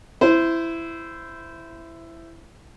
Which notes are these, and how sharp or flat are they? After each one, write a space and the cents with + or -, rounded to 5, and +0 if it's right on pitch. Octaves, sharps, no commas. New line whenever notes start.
E4 +10 C5 -15